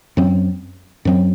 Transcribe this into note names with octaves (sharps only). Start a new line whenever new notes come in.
F#2 F#3 C4
F#2 F#3 C4